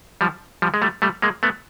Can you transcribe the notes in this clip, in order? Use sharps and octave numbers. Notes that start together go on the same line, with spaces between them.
F3 G3
F3 G3
G#3
G3 A3
G3 A3
G#3 A#3
A3 B3